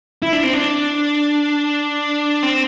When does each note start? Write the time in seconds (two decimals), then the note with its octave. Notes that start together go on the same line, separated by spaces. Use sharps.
0.22 E4
0.33 D4
0.43 C4
0.53 D4
2.43 C4